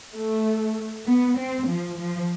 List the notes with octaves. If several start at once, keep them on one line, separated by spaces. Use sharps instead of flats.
A3
B3
C4
F3
F3